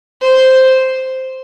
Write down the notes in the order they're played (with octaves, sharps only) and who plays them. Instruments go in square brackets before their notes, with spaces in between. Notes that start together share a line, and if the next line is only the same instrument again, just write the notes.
[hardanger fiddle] C5